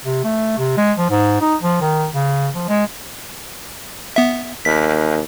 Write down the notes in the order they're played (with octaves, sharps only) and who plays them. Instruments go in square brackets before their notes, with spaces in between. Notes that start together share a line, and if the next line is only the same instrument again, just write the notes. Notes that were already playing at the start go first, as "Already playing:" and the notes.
[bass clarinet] C3
A3
C3
G#3
F3
G#2
D#4
F3
D#3
C#3
F3
G#3
[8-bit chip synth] B3 E5
[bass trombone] D#2 [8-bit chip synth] B6